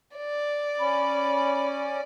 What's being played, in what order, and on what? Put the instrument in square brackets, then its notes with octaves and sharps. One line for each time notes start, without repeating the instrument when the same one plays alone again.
[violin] D5
[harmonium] C#4 [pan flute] B5